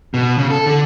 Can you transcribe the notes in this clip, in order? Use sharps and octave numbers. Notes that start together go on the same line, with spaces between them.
B2
C#3
A4
D3